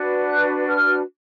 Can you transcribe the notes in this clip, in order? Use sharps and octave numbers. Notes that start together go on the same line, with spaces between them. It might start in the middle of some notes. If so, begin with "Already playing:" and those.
Already playing: D4 F#4 B4
F#6
F6